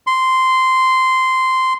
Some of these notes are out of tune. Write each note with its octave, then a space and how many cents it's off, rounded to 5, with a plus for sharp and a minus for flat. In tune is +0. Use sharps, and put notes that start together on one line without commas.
C6 -10